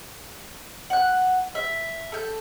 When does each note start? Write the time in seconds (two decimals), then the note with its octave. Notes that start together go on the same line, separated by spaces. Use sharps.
0.90 F#5 F#6
1.55 E5
2.12 A4 G6